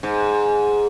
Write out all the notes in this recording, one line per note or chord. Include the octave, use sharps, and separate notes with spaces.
G#2